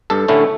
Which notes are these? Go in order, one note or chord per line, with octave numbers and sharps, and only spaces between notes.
G2 A4
D3 A3 C#4 E4